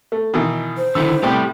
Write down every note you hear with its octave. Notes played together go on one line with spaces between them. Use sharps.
A3
B2 D#3 E3
C5
D3 D#3 E4 E6
A2 C3 G3 B3 G4 G5